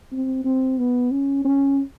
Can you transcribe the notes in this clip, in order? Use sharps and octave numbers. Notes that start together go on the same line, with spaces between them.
C4
C4
B3
C#4
C#4